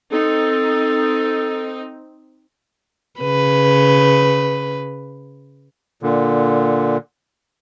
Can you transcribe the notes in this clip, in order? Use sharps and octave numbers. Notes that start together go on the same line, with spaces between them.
C4 D#4 A4
C#3 B4
A#2 D3